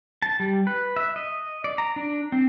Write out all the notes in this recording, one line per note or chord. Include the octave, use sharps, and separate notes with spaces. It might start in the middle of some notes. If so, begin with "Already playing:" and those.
A5
G3
B4
E5
D#5
D5
A#5
D4
C4